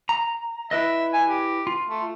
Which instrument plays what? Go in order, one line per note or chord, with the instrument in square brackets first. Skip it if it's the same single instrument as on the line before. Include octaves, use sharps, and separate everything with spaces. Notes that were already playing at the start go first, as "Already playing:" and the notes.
[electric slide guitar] A#5
[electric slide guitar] E4 B4 D#5 [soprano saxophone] E5
[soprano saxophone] G#5
G4
[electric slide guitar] F4
[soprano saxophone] A3